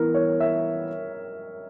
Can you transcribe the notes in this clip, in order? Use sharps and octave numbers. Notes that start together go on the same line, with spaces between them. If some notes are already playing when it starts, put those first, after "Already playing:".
Already playing: E3 B3 E4 A#4
C#5
E5